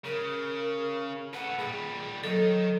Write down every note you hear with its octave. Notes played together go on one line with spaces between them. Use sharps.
C#3 A#4
A4 B4 F#5
A#2 G3 G#4
D#3 F#3 D#4 A4